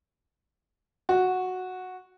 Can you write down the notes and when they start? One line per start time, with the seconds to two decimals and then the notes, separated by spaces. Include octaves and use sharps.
1.09 F#4